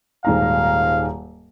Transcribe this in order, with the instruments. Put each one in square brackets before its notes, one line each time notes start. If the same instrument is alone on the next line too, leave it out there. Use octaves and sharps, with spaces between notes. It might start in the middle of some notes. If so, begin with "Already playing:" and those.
[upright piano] D#1 G#2 A#5 [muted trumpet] F5